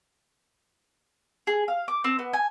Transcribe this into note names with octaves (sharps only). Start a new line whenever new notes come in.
G#4
F5
D6
C4
B3
G#5